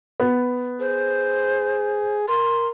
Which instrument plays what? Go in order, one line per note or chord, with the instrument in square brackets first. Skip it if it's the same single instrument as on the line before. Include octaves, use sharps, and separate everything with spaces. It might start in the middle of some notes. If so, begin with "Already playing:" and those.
[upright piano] B3
[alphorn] G#4 [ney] C5
[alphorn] A#4 [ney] C6